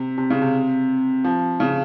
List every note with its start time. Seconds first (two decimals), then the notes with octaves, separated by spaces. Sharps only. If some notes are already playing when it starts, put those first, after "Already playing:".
Already playing: C3
0.18 C3
0.30 C#3
0.42 C3
1.24 F3
1.60 C#3